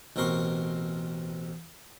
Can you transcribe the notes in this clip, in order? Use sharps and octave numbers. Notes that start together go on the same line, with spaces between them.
A1 B2 C4 A#4 C6 C#6